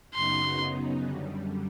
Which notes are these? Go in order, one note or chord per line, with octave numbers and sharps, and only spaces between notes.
F#2 C#3 F#3 B3 D#4 C6
F#2 D3 G3